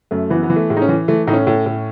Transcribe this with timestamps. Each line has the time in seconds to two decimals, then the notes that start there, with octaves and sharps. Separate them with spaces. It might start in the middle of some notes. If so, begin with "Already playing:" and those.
0.11 F#2 A3
0.30 E3 B3
0.43 B3
0.50 E3
0.56 A3
0.70 A2 G#3
0.77 D#4
0.82 C#4
0.88 E3
1.08 E3 A3
1.27 A2 D#4
1.33 C#4
1.47 A2
1.66 A2